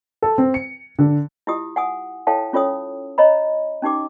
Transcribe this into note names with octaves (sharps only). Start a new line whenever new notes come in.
A4
C4
C#7
D3
E4 F4 G4 D#6
F#5 G#5 D#6
E4 A4 C#5 F5 G5 A5
C#4 F4 A4 C#5 D#6
C#5 D#5 A#5 B5
C#4 D#4 G4 D6